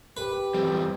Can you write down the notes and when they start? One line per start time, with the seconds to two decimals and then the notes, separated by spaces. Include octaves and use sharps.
0.17 G4 B4
0.54 E2 G3 C4